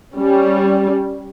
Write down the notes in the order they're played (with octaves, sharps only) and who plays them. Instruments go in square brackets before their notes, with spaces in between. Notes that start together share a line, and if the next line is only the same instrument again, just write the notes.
[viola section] G3 C#4